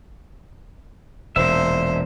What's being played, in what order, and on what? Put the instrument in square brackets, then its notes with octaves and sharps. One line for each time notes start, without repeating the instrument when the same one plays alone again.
[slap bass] E1 A#2 [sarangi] C5 [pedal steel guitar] E5